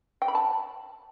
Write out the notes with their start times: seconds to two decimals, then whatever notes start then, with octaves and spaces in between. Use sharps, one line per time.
0.22 G5
0.28 B5
0.35 A5